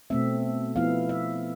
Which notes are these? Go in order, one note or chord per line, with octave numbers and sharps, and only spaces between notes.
B2 A3 C4 E5
F3 B3 E4 F5
E5